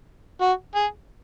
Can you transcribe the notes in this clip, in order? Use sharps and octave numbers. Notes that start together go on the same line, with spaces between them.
F#4
G#4